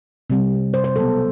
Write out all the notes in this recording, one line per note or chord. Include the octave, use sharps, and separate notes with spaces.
C3 G3 C4
C5
C5
B2 F#3 B3 A4